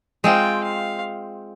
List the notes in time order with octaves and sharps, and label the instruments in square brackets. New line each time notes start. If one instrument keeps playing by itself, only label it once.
[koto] G#3 C4 F4 [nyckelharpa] G5
[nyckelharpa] F5